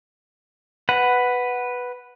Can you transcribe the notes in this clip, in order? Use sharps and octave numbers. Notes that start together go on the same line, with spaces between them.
B4 F#5